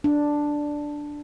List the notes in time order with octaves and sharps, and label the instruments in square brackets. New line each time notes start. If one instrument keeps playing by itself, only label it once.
[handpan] D4